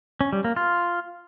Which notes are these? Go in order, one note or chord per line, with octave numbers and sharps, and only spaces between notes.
C#4
G3
A#3
F4